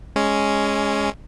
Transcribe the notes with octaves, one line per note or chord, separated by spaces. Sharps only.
G#3 C#4